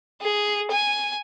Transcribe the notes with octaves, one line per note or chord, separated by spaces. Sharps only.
G#4
G#5